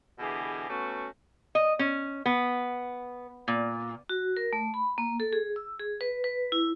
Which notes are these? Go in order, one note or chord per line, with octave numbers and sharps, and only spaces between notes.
B2 D3 E3 G4 G#4
A3 B3 C#4 F#4
D#5
C#4
B3
A#2
F#4
A#4
A3
B5
A#3
A4
G#4
E6
G#4
B4
B4
E4